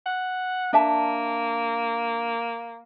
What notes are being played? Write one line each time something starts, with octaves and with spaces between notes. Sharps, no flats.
F#5
A#3 D4 E5 A5